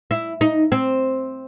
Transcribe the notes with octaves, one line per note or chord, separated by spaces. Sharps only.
E4
D#4
C4